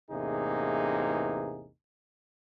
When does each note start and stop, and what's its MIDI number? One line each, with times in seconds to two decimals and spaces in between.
0.11 1.70 33
0.11 1.70 40
0.11 1.70 48
0.11 1.70 58
0.11 1.70 63
0.11 1.70 68